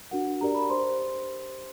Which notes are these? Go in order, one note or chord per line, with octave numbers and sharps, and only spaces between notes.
D4 F#4 A#4 F#5
D4 G4 A#4 D5 A#5
B5
G4 C5 C6